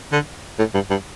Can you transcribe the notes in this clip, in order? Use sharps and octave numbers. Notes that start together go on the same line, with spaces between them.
D3
A2
G2
G2